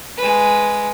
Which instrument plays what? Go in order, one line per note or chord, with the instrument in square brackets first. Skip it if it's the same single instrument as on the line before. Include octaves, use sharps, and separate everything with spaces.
[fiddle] G#3 B4